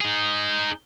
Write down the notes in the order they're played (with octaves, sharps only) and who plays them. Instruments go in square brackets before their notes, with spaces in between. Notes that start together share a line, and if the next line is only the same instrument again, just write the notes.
[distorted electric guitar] D#4 G#4